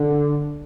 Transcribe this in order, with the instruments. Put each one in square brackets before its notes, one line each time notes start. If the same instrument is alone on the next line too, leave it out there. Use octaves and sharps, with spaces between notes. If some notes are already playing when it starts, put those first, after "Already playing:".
Already playing: [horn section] D3